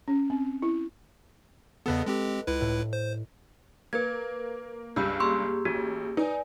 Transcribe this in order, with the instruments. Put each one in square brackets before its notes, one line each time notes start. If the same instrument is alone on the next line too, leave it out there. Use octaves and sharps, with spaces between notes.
[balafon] C#4
C4
E4
[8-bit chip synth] E2 C#3 B3 [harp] A4 B4 D#5
[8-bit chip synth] G#3 C4 G4
C#2 E4 B4
[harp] A2
[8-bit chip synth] C5
[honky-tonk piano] A#3 [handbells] B4 G#6
[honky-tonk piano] C#2 G2 [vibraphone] G4 [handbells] B5 E6 G6
[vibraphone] A#3 G4 G#4 [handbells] C6 C#6 E6
[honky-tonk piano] A1 [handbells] F#4
[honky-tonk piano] D#4 [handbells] B4 [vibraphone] D5 G#5